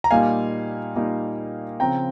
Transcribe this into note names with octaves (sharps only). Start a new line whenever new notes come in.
A#5
A#2 G3 A#3 D#4 F5 G#5
A#2 G3 A#3 D#4
C#3 F3 C4 G5 A#5